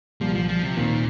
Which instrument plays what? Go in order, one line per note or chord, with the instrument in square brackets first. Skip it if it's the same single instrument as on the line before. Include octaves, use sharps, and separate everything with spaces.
[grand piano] C2 A#2 G3 [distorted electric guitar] F3
[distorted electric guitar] F3
F3
C3
[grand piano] D#2 D#3 C4 [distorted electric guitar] A#2